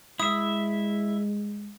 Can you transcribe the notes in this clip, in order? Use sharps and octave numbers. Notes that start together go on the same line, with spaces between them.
G#3 E4 E5 D#6